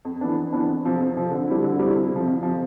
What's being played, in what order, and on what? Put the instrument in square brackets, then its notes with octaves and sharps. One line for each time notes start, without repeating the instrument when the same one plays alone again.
[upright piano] F2
E3 B3 D4
F2
E3 B3 D4
F2
C3 F3 C4
F2
C3 F3 C4
D3
G3 C4 E4
D3
G3 C4 E4
F2
C3 F3
F2
C3 F3